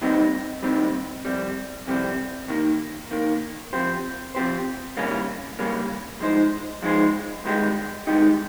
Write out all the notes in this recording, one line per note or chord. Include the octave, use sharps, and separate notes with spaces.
D#2 D#3 G3 C4 D#4
D#2 D#3 G3 C4 D#4
F2 C3 G3 C4
F2 C3 G3 C4
D#2 D#3 A#3
D#2 D#3 A#3
F3 C4 G4 C5
F3 C4 G4 C5
D#2 C#3 G3 A#3 C#4
D#2 C#3 G3 A#3 C#4
F3 G#3 D#4 G#4 C5
F3 G#3 D#4 G#4 C5
G2 D#3 G#3 D#4 G4
G2 D#3 G#3 D#4 G4